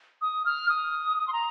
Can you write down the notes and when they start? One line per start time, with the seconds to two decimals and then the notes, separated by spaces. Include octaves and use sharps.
0.22 D#6
0.46 F6
0.69 D#6
1.18 D#6
1.28 C6
1.33 A#5